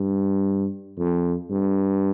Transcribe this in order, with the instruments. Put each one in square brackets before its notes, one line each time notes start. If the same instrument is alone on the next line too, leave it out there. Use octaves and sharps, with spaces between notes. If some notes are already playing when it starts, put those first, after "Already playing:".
Already playing: [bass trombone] G2
F2
G2